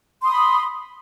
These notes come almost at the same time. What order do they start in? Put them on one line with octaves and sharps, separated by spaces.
C6 D#6 B5